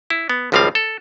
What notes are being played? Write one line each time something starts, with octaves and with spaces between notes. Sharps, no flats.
E4
B3
G#1 C#2 F3 G3 C4 F5
A4